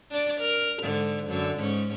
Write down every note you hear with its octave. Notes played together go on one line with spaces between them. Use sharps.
D4 D5
A#4
G#2 D3
F#2 D3
G#2 C#4